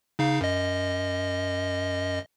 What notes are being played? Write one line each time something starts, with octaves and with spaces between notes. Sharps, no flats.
C#3 D#4 F5
F#2 D#5